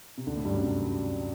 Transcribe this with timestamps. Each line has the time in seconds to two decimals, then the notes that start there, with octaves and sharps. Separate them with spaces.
0.18 C3
0.27 D2 D3
0.36 A2 A3
0.45 G2 G3
0.54 F#2 F#3
0.63 C3